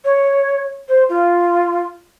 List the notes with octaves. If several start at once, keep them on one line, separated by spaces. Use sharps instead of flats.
C#5
C5
F4